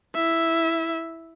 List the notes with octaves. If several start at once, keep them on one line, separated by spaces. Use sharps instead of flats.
E4 E5